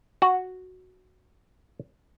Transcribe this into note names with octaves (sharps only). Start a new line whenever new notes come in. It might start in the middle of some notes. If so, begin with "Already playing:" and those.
F#4 F#5